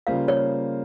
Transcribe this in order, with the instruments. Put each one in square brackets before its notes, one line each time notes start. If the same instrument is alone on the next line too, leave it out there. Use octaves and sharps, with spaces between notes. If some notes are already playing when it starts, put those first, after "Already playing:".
[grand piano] C#3 G3 A#3 F4 C5 [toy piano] F5
[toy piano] C#5